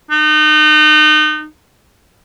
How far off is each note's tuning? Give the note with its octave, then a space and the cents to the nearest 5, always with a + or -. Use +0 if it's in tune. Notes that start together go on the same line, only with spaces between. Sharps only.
D#4 -30